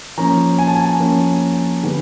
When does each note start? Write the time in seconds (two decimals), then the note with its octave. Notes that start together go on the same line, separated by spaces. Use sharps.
0.18 F3 A#3 C#4 A#5
0.59 G#5
0.67 A5
0.75 G#5
1.00 F3 A#3 C#4
1.83 D3 G3 B3 D4